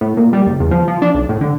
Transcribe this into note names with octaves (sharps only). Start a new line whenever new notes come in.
A2
A#2
G3
F#1
E2
F3
F3
D4
B1
A2
D3